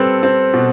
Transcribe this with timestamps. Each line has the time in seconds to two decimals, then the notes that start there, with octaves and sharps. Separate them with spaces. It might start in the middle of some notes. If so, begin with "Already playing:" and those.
Already playing: G3 C4 A4 B4
0.23 C4
0.53 B2